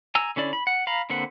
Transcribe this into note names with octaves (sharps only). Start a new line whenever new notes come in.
G#5 A#5 E6
D3 C#4 E4 D5
B5
F#5
F5 A#5 B5
D3 A#3 C4 B4 F#5